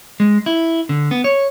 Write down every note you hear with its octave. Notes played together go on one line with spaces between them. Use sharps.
G#3
E4
D3
B3
C#5